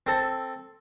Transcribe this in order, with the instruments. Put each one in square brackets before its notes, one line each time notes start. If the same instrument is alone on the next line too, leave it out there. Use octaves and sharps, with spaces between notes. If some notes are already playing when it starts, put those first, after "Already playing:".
[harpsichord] C4 A4